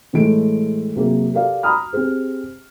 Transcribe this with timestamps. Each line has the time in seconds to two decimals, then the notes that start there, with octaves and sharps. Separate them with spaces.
0.13 A2 E3 G#3 A3 D7
0.96 C3 F#3 A#3 G#4
1.33 G4 A4 A#4 D5 F5
1.63 A#5 B5 D#6 F6
1.93 C4 G4 G#4 C5